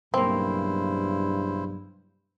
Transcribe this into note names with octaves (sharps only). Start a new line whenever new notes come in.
B1 G2 C#3 A#3 C4 E4 C5